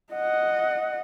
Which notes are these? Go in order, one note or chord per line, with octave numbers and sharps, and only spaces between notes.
D#5 F#5